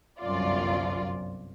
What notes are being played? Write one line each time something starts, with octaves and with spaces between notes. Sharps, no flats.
G1 C2 F#2 F4 D5